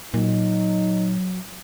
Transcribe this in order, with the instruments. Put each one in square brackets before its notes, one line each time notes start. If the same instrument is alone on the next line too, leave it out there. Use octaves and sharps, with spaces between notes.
[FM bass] A#2 [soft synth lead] F#3 [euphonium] D#4